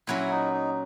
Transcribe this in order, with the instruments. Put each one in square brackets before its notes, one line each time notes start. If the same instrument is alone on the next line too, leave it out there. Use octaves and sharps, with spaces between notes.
[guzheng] A#2 F#3 C#4 F#4 [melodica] E4
[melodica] D#4
D#4